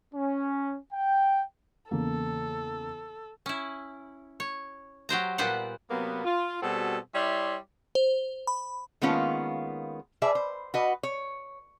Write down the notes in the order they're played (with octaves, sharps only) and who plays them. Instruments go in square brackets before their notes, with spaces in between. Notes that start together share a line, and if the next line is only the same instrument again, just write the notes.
[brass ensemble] C#4
G5
[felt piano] E2 C#3 A#3 [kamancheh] A4
[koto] C#4 E4
C#5
F#3 G4 C5 A#5
A#2 G3 B3 C5 F#5
[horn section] C3 F#3 A#3 B3
F4
B2 G3 C4 F#4 G#4 A4
G3 E4 C#5 D5 E5 C6
[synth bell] C5
B5
[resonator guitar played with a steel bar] D#3 G#3 A#3 B3 C#4 F4
G#4 B4 D5 E5
C5
F#4 B4 D#5
C#5